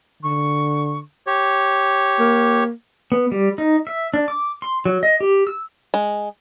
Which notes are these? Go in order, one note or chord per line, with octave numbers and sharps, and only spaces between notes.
D3 C#6
G4 C#5
A#3
B3
G3
D#4
E5
D4
D6
C6
F#3
D#5
G4
E6
G#3